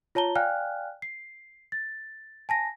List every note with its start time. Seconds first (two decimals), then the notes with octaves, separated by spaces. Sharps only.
0.15 F4 C#5 A5 A#5 G7
0.35 D5 F5 G5 G#5 F6 F#6
1.02 C7
1.72 A6
2.49 G#5 A5 A#6